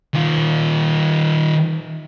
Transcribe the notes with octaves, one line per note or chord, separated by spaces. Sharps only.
D#3 F4